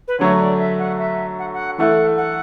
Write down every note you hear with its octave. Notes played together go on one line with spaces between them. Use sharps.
B4
D3 F#3 A3 C#5
D5
E5
F#5
E5
F#5
F#5
E3 A3 E4 A4 F#5
F#5